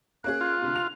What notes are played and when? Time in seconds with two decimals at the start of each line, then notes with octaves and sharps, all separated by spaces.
0.24 A#3 C#4 G#4 F#6
0.41 F4
0.62 D2 C3
0.76 F7